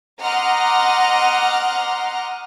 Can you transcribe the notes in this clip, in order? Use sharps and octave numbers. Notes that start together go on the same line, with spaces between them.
D#5 F#5 A#5 C6 D6 F6